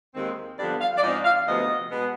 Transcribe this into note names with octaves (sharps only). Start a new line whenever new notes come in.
D#2 D#3 G#3 C4
G2 D3 F3 B3 D5
F5
D5
G#2 F3 C4 D#4 D#5
F5
D2 C3 F3 B3 D#5
B2 G#3 B3